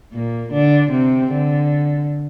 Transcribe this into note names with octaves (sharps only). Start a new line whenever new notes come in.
A#2 A#3
D3 D4
C3 C4
D3